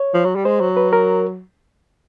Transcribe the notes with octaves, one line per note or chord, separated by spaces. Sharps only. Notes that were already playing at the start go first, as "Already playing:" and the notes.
Already playing: C#5
F3
F#3
G3
G#3 C5
F#3
B4
A#4